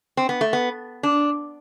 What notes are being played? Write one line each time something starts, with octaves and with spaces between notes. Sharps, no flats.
C4
B3
A3
B3
D4